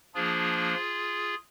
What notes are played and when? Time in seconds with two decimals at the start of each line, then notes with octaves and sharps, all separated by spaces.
0.14 F3 A#3 D4 F4 G#4